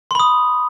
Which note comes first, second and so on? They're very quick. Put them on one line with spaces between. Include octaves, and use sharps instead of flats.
C6 B5 D#6